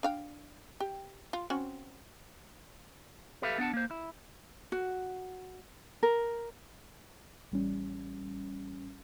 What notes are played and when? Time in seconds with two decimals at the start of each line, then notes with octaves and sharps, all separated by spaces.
0.03 D4 F5 G5
0.80 G4
1.33 F4
1.50 C4 C#4 F#4
3.42 G4 A4 B4 E5 F5
3.58 B3 D4 F#5 A5
3.74 A#3 C5
3.91 E4
4.72 F#4
6.03 A#4
7.52 A1 G3 C#4